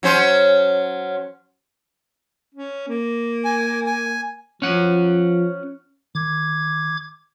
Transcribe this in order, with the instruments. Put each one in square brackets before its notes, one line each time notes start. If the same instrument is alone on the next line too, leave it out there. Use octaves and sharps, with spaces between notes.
[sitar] F#3 C#4 C5
[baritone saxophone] C#4
A#3
[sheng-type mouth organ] G#5
G#5
[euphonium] F3 [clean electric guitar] C#4 F#5
[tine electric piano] D#3 [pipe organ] D6 G#6